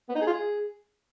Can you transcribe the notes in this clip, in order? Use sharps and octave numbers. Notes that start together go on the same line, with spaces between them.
B3
D#4
G#4
F4
G#4